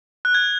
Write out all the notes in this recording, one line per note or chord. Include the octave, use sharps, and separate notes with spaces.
F#6
G#6